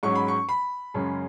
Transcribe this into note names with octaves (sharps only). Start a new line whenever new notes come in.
G#2 F#3 C#4 C#6
B5
C#6
B5
F#2 C#3 G#3 C#4